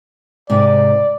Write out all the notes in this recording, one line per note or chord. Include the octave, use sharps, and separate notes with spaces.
G#2 C3 D5